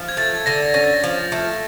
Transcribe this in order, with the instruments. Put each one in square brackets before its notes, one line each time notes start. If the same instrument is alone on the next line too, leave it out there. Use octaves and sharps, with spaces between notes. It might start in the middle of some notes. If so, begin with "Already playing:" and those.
Already playing: [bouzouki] F3
[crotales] G#6
[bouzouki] A3 [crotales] A6
[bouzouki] D3 [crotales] A#6
[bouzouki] C#4 [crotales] A#6
[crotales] A6
A#6
[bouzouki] F3
A3